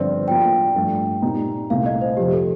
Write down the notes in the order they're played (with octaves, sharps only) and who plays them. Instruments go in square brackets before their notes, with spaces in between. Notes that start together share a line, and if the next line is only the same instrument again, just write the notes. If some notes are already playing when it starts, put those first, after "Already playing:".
Already playing: [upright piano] G1 G2 F3 C4 F4 [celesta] C5 D5
[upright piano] A2 F3 A#3 F4 [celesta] G5
[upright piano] G2 F3 A3
A#2 G3 C4 D#4
[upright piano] C2 A#2 A3 C4 [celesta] F5
[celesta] D#5
C5
[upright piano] F2 C3 F3 [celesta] G4
[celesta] A4